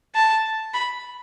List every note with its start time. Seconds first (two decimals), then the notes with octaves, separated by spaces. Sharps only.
0.15 A5
0.73 B5